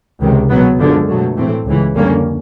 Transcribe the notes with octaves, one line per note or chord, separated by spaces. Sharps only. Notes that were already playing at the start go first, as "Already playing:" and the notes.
C#2 C3 D#3
B2 F#3 B3
F#2 D3 F3 G#3
B2 F#3 A3
A2 E3 A3 C4
C#2 C#3 E3
F2 D3 G3 A#3 C#4